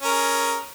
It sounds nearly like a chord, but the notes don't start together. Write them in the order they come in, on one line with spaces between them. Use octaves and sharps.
C#4 A#4 G#4